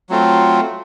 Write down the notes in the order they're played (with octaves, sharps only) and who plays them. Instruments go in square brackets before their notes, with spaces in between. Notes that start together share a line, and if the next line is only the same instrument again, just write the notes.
[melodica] F#3 A3 C4 F4